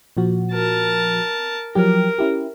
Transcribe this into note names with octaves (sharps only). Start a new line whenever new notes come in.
A#2 F3 F#4
A#4 A5
F3 F#3 G4 A#4
C#4 E4 G4